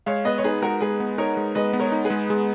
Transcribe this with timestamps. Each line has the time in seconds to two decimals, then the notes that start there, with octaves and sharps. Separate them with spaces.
0.06 G#3 C#5 F5
0.25 B3 B4 D#5
0.38 C#5
0.44 D#4 G#4 B4
0.62 G#3 F#4 A#4
0.81 G#3 G#4 B4
1.00 B3
1.18 D#4 A#4 C#5
1.37 G#3
1.55 G#3 B4 D#5
1.73 B3
1.79 A#4 C#5
1.92 D#4
2.05 G#4 B4
2.10 G#3
2.30 G#3